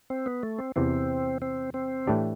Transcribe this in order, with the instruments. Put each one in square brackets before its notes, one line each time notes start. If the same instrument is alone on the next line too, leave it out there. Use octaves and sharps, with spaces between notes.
[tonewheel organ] C4
B3
A3
C4
[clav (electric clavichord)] E2 C3 E3 [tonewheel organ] C4
[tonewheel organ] C4
C4
[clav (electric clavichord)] A2 E3 A3 D4 G4